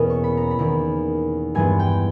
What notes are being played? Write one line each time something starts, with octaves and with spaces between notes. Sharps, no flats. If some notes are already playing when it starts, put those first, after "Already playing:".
Already playing: E2 B2 A#3 C#4 D#6
C#6
B5
A#5
B5
E2 D#3 A#3
G2 E3 G#3 B3 G#5
G5